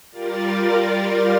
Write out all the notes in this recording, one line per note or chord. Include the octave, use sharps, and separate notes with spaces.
G3 F4 A#4 D5 A6